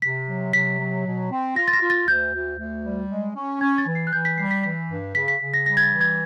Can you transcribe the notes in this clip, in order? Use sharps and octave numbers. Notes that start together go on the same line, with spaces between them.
C3 B6
F#3
C3 B6
F#3
B2
C4
F4 A#6
A6
A#6
F4
A6
D2 G6
D2
D2
G3
G#3
C#4
C#4 G#6
A6
E3
C7
F#6
E3 G6
B6
G3 C7
B6
E3 B6
G2
C#3 B6
B6
C#3
A#6
G3 A#6
G#6
A6
E3
G#6